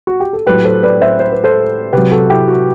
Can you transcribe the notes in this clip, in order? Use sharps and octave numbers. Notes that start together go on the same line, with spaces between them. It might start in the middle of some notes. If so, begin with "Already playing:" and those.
F#4
G4
A4
A2 F#3 G4 B4
A4 C5
B4 D5
C5 E5
C5
B4
A4 C5
C3 F#3 G4 B4
F#4 A4
E4 G4
F#4